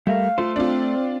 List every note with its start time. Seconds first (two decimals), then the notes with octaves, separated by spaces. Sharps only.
0.07 G3 A3 A#4 F5
0.38 A3 F4 A4 C5
0.56 C4 D4 F4